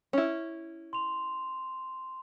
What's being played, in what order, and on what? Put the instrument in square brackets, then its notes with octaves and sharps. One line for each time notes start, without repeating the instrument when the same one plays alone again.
[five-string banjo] C#4 E4
[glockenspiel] C6 F7